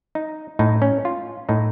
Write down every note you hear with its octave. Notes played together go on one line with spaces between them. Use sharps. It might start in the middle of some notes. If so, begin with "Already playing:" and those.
D#4
A2 D#4
C#4
F4
A2 D#4